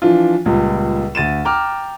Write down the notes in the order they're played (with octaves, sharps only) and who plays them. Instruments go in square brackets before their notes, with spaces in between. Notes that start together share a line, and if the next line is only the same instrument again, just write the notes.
[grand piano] E3 F3 D4 F4
C#2 A#2 G3
D2 A6 D#7 E7
G5 A#5 D6 F6